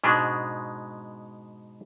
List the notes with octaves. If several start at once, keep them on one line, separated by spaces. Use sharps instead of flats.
G#2 B2 G#3 D4